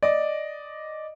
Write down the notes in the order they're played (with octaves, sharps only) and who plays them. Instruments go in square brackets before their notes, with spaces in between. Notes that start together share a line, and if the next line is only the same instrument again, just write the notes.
[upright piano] D5 D#5